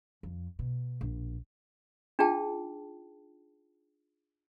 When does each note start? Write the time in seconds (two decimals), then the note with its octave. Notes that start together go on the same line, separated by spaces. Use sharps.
0.23 F2
0.59 B2
1.01 A#1
2.19 D4 D#4 F4 G#4 G5 A5